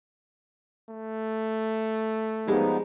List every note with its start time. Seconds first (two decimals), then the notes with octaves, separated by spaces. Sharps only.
0.90 A3
2.48 F3 G3 G#3 B3 D#4